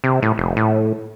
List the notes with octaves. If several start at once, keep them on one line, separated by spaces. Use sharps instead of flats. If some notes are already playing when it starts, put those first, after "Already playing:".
C3
A2
F1
A2